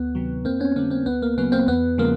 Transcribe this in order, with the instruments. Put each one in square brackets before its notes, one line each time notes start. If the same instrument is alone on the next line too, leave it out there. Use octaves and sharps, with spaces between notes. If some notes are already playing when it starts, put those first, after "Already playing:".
Already playing: [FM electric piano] D2 B3
C3 D#3 F#3
F2 A#3 C4
B3 C#4
D3 G3 A#3 C4
A#3 C4
D2 B3
A#3
C#3 F#3 B3
A#3 C4
E2 B3
C#3 F3 G#3 A#3